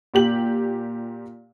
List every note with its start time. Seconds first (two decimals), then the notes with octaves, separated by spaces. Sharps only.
0.14 A#2 G4 F#7